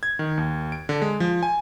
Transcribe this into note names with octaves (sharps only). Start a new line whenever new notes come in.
G#6
D#3
D#2
D7
D3
G#3
F3
G#5